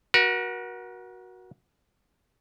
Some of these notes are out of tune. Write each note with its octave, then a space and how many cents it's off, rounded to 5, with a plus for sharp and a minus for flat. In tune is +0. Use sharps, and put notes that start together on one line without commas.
F#4 +0 A#4 +40